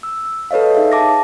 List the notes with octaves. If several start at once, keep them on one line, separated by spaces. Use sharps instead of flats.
E6
A4 B4 C#5 D#5 F5
D#4 G#4 E5 F5
A5 D6 A#6